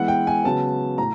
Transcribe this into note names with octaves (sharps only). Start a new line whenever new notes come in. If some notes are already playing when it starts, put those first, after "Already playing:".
Already playing: E3 G#3 B3 F#5
G5
G#5
C#3 F#3 B3 A5
A2 A#5